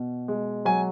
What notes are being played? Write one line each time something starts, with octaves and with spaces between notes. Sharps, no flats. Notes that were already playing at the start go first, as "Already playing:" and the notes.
Already playing: B2
G#3
F#3 G#5